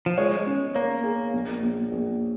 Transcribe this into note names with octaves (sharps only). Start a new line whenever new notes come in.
F3
G#3 C#5
C#4
A#3 C#5
G#4
A#1
A#1
A#1